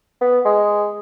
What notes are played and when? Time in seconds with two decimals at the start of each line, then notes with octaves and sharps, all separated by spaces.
0.21 B3
0.45 G#3